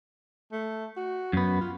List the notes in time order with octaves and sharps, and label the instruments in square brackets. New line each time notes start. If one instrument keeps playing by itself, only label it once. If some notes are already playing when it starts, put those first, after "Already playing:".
[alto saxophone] A3
F#4
[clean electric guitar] F#2 B3
[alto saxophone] F4